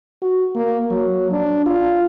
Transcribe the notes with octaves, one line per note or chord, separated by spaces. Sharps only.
F#4
A#3
F#3
D4
F4